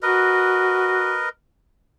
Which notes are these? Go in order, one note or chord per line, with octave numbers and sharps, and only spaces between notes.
F#4 A#4 B4 D#5